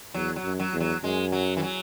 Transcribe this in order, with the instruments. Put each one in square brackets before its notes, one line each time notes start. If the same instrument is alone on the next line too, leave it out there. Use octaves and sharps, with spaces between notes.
[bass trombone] E2 [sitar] F#3
[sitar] F#3
[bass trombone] F#2
[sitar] F#3
[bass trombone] E2
[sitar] F#3
[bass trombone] F#2 [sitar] G#3
[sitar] F#3
E3
F#3